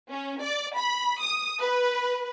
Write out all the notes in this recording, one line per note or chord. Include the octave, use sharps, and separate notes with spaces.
C#4
D5
B5
D#6
B4